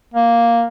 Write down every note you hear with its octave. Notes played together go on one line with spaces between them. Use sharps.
A#3